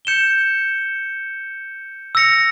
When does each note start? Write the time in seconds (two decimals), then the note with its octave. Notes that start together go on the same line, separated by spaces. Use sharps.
0.05 G6 C#7 E7 G7
2.15 E6 A#6 C#7 F7